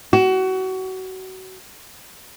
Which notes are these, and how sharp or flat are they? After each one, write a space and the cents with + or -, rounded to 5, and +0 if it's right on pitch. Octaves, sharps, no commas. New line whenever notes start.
F#4 +25